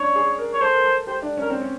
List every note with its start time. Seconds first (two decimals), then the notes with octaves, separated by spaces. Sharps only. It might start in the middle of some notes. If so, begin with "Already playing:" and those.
Already playing: C#4 D4 C#5
0.16 G#4
0.39 A#4
0.53 C#5
0.61 A4 C5
0.74 A#4
0.84 A4
1.07 G4 C5
1.22 D4
1.37 C#4 A#4
1.50 C4
1.62 C#4